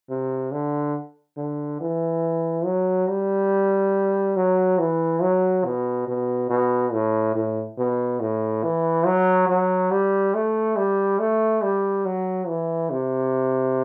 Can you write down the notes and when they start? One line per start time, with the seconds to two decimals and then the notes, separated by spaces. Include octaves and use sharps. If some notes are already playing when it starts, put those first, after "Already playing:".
0.10 C3
0.52 D3
1.37 D3
1.80 E3
2.66 F#3
3.08 G3
4.37 F#3
4.79 E3
5.22 F#3
5.65 B2
6.07 B2
6.50 B2
6.93 A2
7.35 A2
7.78 B2
8.21 A2
8.63 E3
9.06 F#3
9.48 F#3
9.91 G3
10.34 A3
10.77 G3
11.19 A3
11.62 G3
12.05 F#3
12.47 E3
12.90 C3